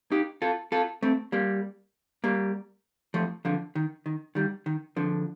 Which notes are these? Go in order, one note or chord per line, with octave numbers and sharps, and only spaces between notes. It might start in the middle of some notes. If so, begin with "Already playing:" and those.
D#4 G4
F4 A4
F4 A4
A3 C4
G3 A#3
G3 A#3
F3 A3
D3 F3
D#3
D#3
D#3 G3
D#3
D3 F3